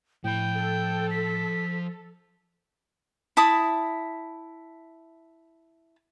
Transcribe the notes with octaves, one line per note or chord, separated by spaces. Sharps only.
A2 F3 G5 B5
A4
B6
E4 A5 B5 D#6